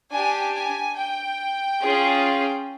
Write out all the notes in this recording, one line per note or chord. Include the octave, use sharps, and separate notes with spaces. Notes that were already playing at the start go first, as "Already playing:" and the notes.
D4 G4 G#5
G#5
G5
C#4 F4 G#4